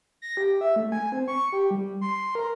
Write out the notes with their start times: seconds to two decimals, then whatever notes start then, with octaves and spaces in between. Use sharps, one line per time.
0.22 A#6
0.37 G4
0.61 E5
0.76 A3
0.92 G#5
1.12 C4
1.28 C#6
1.52 G4
1.71 G3
2.01 C6
2.35 A#4